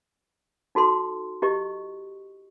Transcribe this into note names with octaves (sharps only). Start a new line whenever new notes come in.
D#4 F#4 A4 C6
E4 G4 D#5 C#6